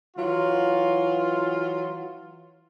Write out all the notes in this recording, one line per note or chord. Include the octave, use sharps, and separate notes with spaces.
E3 F#3 F4